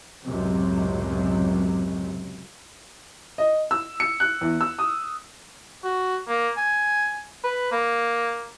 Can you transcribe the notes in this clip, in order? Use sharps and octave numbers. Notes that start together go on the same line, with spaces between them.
C#2 F#2 A2 C3 F#3
D#5
E6
C#7
F#6
E2
E6
D#6
F#4
A#3
G#5
B4
A#3